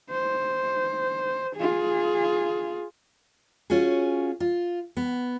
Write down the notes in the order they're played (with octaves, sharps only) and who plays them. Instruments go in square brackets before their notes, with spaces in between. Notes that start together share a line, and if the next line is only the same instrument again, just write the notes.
[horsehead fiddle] C5
F4 G#4
[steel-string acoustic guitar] C#4 F4 F#4 G#4
F4
B3